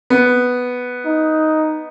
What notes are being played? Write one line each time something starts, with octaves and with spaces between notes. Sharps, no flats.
B3
D#4